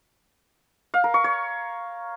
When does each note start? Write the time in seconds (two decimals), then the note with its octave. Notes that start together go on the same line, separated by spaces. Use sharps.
0.94 F5
1.04 A#4
1.14 C#6
1.24 C#5